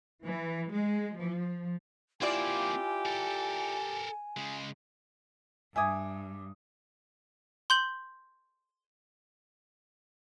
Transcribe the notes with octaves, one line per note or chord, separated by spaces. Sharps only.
E3
G#3
F3
A#3 C4 E4 F4 G4 D5 G#5
A4 A#4
C#3 G#3
G2 E5 G#5 D6 D#6 G#6
C6 G6 F#7